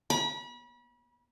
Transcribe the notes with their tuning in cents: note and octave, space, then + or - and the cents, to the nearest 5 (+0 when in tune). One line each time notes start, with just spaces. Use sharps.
B5 -35